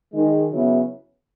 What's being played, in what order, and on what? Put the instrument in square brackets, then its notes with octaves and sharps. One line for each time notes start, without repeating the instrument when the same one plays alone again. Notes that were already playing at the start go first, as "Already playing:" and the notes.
[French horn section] D#3 G#3 D#4
C#3 F#3 B3 E4